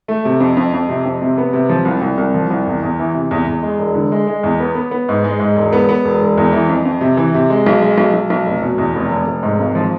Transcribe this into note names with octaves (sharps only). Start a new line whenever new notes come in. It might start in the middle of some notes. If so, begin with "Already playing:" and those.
A3
C3
F2
F2
F2
C3
F2
C3
B3
C3
F3
C2
C2
C2
F3
C2
E2
E2
E3
C3
E2
E2
G#3
E1
D3
G#3
G#3
E2
B3
B3
B3
G#2
G#3
G#2
E1
B3
B3
E1
E1
E2
E3
F2
F2
C3
E3
C3
G#3
B1
G#3
B1
B1
B1
F1
B2
E2
F1
F1
F1
G#2
G#1
F3